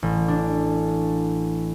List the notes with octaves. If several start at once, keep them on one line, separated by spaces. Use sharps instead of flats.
A1
D4